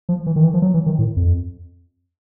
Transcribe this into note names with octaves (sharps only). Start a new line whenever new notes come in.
F3
E3
D#3
E3
F3
F#3
E3
D#3
A2
F2